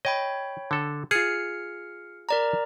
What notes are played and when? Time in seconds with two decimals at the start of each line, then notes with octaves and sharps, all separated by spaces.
0.05 C#5 D#5 G5 B5
0.71 D3 A4
1.11 F4 G#4 F6 C7 C#7
2.29 A#4 D5 A#5